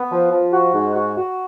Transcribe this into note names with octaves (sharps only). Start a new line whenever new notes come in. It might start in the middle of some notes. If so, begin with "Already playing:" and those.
Already playing: B3
F3
F3
F#4
G#2
F#4
F#4